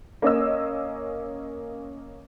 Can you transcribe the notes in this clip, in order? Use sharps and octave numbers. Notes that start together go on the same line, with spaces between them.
A#3 C#4 D#5 E6